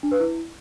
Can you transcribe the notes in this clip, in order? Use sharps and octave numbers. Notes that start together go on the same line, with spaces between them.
D4
B4
E4